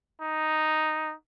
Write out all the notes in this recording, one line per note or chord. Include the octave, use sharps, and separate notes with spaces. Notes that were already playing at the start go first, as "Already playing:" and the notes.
D#4